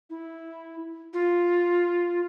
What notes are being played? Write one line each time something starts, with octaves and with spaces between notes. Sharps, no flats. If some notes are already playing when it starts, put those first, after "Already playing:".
E4
F4